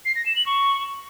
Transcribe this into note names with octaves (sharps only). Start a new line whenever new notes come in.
C7
A#6
E7
F#7
C#6